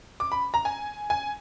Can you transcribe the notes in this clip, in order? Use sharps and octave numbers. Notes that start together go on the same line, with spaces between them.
D6
B5
A#5
G#5
G#5